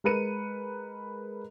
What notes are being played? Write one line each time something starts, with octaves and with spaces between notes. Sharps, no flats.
G#3 A#4 B4 C#7 D#7